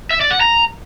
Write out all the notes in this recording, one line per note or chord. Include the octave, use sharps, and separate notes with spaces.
E5
D5
F#5
A#5